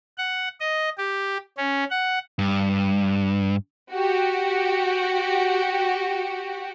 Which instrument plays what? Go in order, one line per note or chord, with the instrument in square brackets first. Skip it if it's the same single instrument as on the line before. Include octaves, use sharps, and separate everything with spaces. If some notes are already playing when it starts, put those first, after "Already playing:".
[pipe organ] F#5
D#5
G4
C#4
F#5
[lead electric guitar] G2
[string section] F#4 G4